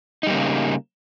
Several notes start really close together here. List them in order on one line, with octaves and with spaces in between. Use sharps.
D#4 G3 A#3 C#3